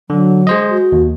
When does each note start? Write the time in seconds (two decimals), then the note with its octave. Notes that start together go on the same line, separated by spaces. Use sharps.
0.10 D3 F#3
0.47 G#3 C5 D#5
0.69 F#4
0.92 D#2